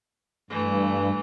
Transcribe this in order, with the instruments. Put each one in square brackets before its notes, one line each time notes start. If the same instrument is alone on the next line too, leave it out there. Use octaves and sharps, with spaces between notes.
[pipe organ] G2 [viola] E3 A3